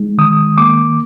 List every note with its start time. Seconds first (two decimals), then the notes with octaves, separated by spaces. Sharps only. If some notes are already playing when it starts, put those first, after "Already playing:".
Already playing: G#3 D#4
0.18 D#3 D#6
0.58 A#3 D6